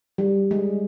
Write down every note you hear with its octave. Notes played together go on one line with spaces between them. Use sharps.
G3
G#3